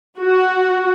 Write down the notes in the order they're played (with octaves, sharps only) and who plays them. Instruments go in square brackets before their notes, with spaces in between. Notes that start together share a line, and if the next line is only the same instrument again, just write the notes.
[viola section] F#4